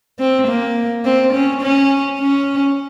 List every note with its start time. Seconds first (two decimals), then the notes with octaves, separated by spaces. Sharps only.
0.19 C4
0.48 A#3
1.05 C4
1.33 C#4
1.61 C#4
2.19 C#4